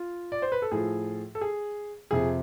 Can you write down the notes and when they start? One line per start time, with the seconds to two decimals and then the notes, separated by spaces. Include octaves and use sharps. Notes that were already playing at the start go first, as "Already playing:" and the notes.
Already playing: F4
0.32 D5
0.42 C5
0.52 B4
0.62 A4
0.72 A2 F3 G#4
1.35 A4
1.41 G#4
2.11 F2 C3 F3 G#4